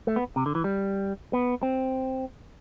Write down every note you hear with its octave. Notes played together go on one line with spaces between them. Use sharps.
A3
B3
C3
D3
E3
G3
B3
C4